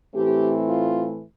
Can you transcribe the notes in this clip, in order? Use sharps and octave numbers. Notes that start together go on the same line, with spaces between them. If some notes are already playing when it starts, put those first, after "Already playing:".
A2 E3 A3 C4 G4
F4